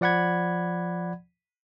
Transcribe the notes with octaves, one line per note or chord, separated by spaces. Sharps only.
F3 D5 F#5 B5 G#6